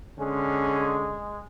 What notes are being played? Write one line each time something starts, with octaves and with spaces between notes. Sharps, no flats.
D3 G#3 C#4 G#4